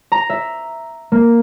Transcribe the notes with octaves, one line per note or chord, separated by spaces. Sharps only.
A#5
E5
A#3